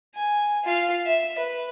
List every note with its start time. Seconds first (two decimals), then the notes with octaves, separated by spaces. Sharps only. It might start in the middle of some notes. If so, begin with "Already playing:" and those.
0.15 G#5
0.64 F4 F5
1.06 E5
1.38 B4